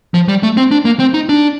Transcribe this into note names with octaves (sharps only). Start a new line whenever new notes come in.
F3
G3
A3
C4
D4
A#3
C4
D#4
D4